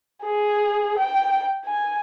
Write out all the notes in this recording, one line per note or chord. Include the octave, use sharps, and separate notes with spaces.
G#4
G5
G#5